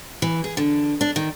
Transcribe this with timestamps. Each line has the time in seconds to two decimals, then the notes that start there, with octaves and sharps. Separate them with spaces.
0.22 E3
0.44 G#4
0.57 D3
1.01 D4
1.16 D#3